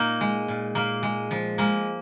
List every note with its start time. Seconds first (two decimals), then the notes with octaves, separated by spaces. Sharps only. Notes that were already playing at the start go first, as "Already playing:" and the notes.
Already playing: A#2 A#3 D#4
0.21 G#3
0.48 A#2
0.75 A#2 A#3
1.03 G#3
1.31 F3
1.58 G#3 A#3